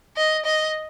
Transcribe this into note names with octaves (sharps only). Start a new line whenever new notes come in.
D#5
D#5